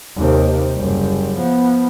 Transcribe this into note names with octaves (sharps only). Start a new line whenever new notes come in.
D#2 C3
F#1 G3
F3 B3